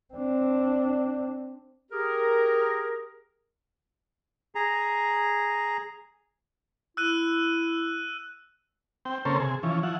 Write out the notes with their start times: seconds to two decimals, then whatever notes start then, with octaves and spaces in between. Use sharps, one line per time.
0.14 C4 D4
1.91 G4 G#4 A#4
4.55 G#4 A#5
6.97 E4 E6 F#6 D#7
9.05 C4 G5
9.25 C#3 A#3 C4 C#4 A4 C5
9.40 C3 G#4
9.63 E3 F3 C#4
9.83 F3 E4 F#5